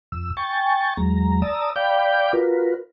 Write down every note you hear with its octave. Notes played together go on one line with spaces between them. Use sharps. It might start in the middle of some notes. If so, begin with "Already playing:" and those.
F2 E6
G5 G#5 C#6 A6
E2 F#3 G#3 A#5
D5 A5 A#5 D#6 E6
D5 F5 G5 B5 D6 G6
F4 F#4 A#4 B4